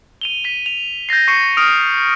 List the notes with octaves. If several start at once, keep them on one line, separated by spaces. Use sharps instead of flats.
D#7 F7 G7
B6 D#7
F7
G6 A6 A#6 C7
C#6 C7 C#7 D#7
D#6 F6 D7 F7